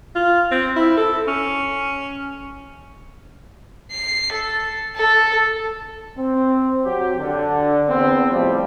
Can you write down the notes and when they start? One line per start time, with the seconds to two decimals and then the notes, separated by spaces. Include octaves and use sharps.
0.16 F4
0.51 C4
0.76 E4
0.97 A4
1.28 C#4
3.91 C7
4.32 A4
4.96 A4
6.17 C4
6.85 F#3 G4
7.19 D3
7.89 E2 B3 C4
8.31 F2 A2 F3 G3